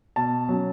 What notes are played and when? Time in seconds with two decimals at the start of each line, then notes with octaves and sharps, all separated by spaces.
0.16 B2 A5
0.49 F#3 C#4